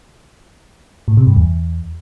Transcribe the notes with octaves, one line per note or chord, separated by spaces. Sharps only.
A2
C3
G2
E2